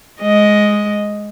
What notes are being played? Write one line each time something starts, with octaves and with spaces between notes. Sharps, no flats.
G#3 D#5